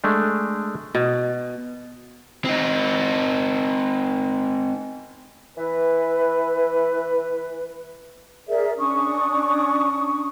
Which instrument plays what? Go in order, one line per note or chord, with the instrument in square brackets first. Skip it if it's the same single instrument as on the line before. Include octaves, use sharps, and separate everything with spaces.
[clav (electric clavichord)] G#3 A3 D4
[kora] B2
[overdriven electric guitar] C4 D#4
[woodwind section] E3 B4
[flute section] G#4 A#4 D5 E5
C#4 D4 C#6 D#6